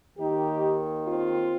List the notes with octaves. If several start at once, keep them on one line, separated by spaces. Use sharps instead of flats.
D#2 D#3 D#4 G4
C4 F4